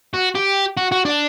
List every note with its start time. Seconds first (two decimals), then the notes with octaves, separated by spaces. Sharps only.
0.14 F#4
0.35 G4
0.77 F#4
0.92 F#4
1.05 D4